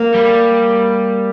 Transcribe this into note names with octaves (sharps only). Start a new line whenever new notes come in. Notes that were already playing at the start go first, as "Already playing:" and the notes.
Already playing: A#3
G3